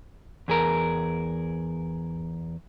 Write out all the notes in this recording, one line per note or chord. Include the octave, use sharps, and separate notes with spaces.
E2 G#4 A#4